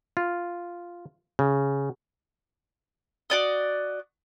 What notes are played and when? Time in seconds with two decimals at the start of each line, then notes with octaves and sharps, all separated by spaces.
0.17 F4
1.39 C#3
3.30 F#4 D5 D#5